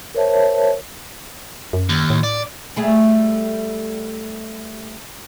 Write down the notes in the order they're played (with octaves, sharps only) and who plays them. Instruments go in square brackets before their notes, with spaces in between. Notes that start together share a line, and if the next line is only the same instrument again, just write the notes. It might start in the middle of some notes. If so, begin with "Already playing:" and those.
[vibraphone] A#4 C5 C#5 E5 A5
[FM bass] F#2
[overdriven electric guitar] D#2
[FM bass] A2
[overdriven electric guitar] D5
[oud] G3 A3 G#4